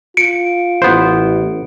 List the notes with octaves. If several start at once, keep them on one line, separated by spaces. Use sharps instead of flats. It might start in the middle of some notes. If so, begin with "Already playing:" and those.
F4 C#7 D7
A1 B3 C5